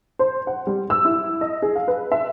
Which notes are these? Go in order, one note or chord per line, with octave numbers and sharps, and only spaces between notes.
C5
F#5
G3
E6
E4
D#5
G#4
F5
B4
E5